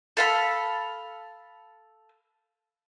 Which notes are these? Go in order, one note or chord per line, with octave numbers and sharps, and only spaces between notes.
A4 F5 B5